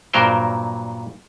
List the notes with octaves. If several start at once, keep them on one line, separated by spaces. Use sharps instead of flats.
G2 A#2 F#3 A#4 C5 G5